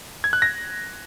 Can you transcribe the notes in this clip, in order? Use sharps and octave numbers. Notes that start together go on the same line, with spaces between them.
G#6
F#6
A#6